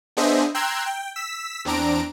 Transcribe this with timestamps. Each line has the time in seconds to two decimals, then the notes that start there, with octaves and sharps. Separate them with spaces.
0.17 B3 D4 G#4 C5 D#5 E5
0.55 G5 A#5 C6 E6 F#6 G#6
0.86 G5
1.16 E6 B6
1.65 E2 C4 D4 A#5 D7